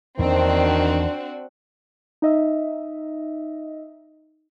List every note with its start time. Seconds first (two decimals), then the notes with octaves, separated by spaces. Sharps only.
0.19 E2 D#3 A#3 C4 D4 F#4
2.22 D#4 D#5 E5